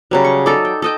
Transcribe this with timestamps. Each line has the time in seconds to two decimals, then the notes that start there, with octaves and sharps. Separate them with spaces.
0.11 C#3 F#3 G3
0.25 C#6
0.46 D#4 A4 D5
0.65 G5
0.82 A4 D#5 G5